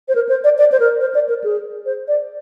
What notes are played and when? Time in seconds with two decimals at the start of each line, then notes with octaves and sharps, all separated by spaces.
0.08 C5
0.15 A#4
0.29 C5
0.44 D5
0.58 D5
0.72 C5
0.80 A#4
1.01 C5
1.15 D5
1.29 A#4
1.44 G#4
1.86 C5
2.08 D5